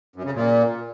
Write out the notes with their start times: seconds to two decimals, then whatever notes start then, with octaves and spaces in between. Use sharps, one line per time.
0.16 F#2
0.25 C#3
0.34 A#2